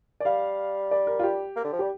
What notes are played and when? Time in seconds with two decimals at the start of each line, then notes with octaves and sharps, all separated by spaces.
0.20 D5
0.25 G3 F5
0.91 D5
1.07 A#4
1.19 F4
1.23 G4
1.56 A#3
1.64 D3
1.73 F3
1.79 G3 G4